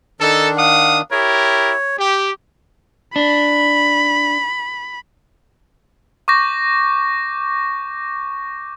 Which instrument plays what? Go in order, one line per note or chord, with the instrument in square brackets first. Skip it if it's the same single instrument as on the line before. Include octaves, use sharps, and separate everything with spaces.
[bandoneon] D#3 D4 [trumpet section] D#4 A4
[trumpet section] F5 F#5 D#6
[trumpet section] E4 G4 A#4 [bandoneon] C#5
[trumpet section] G4
[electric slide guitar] D4 [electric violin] B5
[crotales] C#6 D6 G6 A#6